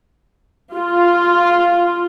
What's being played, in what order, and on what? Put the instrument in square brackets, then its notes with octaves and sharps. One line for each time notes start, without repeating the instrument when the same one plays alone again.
[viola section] F4